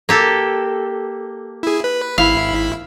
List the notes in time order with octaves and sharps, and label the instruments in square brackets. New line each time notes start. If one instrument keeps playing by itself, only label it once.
[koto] A#3 G4 A4
[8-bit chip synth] E4 G#4
B4
[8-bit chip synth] G#1 E4 B5 [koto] F5